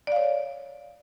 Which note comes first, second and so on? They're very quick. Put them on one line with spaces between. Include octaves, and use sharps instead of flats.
D5 F5 C#5